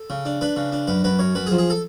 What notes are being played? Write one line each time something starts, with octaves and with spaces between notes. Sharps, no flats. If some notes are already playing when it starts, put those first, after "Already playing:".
Already playing: A4
C#3
D4
D4 B4
C#3
D4
F#2 B4
F#2 B4
F#2 C#5
F#2 B4
G#4
F3
G#4
A4